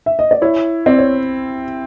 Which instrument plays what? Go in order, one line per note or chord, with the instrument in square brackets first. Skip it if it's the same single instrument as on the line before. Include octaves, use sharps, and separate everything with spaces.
[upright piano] E5
D#5
D5
[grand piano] E4 [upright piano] C#5
[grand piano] C4 [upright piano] D5
[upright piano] C#5